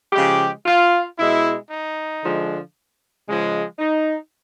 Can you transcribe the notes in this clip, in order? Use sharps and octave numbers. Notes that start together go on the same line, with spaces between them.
C#3 F3 G#3 G4
F4
B2 G#3 E4
D#4
D3 F3 G#3
C#3 F3 G#3
D#4